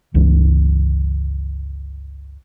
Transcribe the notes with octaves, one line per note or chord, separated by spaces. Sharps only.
G1 C#2 E3